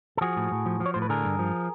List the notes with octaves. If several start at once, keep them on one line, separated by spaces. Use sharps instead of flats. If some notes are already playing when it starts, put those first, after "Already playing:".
A4
F3 F#4 G#4
A2
A2
F3
F3
C#5
A2 C5
B4
D3 G#4 A#4
G2
F3